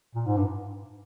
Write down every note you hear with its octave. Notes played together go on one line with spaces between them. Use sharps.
A#2
G#2
G2